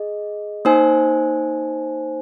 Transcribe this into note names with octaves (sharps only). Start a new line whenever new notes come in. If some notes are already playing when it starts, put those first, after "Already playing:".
Already playing: G#4 D#5
A#3 D#4 C5 G#5